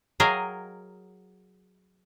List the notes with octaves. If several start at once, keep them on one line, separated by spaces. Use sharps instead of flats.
F#3 G#4 A#4 D#5 F5 G5